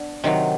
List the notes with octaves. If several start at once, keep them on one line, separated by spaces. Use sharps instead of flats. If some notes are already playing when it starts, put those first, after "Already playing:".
Already playing: B3 D4
C3 D#3 F#3